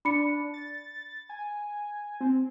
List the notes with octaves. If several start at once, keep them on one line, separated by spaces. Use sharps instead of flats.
D4 B5 C#7
A6
G#5
C4